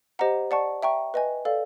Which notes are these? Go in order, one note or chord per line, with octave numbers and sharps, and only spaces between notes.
G4 C5 D#5 F#5 A#5
D5 F#5 A5 C#6
E5 G5 A#5 C#6
B4 D#5 G#5
A4 D5 F5